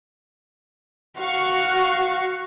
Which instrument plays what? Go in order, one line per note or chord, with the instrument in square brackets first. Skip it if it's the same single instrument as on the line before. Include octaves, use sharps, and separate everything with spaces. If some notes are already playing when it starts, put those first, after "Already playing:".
[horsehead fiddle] F#4 [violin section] F5 C#6